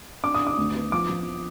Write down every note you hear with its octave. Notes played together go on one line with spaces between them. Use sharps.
D4 D6
D#6
D4
D6
D2
B3
F3 D6
F3